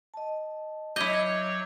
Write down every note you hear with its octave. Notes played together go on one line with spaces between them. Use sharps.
D#5 A5
F#3 E4 C#5 D#5 D6 G6